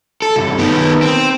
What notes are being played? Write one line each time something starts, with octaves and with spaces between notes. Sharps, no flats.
A4
C2 G2
D#3 B3
C4